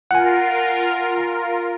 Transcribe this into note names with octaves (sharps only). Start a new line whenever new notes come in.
F4 A#4 F#5 G#5